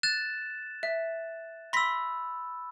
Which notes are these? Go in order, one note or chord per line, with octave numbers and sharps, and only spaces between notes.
F#6 A6 E7
E5
B5 C6 E6 A#6 B6